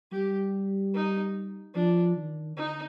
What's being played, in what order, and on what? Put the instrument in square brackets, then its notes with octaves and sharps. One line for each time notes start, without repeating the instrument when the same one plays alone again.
[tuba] G3 [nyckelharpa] G4
[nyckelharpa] D#4
[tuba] F3 [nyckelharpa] D4
[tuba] D#3
[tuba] D3 [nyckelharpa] D#4